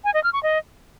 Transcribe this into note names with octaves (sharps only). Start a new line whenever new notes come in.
G#5
D#5
F6
C#6
D#5